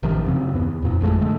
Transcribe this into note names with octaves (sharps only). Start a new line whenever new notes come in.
A1 C3 D#3 F3
F#2 C#3 C4
D#2 B3
F2 A#2
G#1 F2 G#3 A3
G#2 D3 G#3 A3